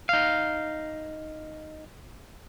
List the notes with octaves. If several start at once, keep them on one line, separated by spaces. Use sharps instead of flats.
D#4 F5